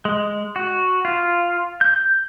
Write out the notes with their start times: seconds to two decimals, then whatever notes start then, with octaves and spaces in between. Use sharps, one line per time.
0.05 G#3
0.56 F#4
1.05 F4
1.81 G6